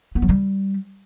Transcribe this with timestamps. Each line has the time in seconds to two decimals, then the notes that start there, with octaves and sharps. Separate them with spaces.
0.15 B3
0.22 F#3
0.29 G3